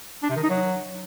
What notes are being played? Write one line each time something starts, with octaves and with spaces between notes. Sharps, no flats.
D4
C3
D#3
D#4
F#3